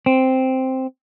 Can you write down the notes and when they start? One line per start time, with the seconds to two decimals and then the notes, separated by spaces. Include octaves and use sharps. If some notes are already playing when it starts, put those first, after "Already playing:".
0.06 C4